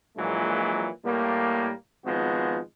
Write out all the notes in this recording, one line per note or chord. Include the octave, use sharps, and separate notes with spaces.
A#1 A#2 E3 F#3 G#3
A2 G3 A#3
G#1 F3 G#3 B3 F#4